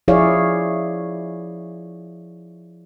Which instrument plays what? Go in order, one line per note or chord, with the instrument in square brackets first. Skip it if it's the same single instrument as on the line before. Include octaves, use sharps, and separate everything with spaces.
[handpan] F3 E4 G#4 C#5 D5 F5